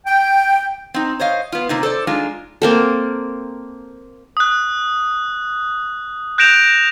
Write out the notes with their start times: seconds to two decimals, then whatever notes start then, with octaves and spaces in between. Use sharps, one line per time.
0.06 G5
0.94 C4 D#4
1.20 C5 C#5 D#5 F5
1.52 B3 F4
1.69 C3 A#3 D#4
1.83 A4 C5 D5
2.07 G#3 D4 D#4 F4
2.62 A#3 C4 A4
4.37 D#6 F#6
6.38 F#6 G6 A#6 D7 E7 F7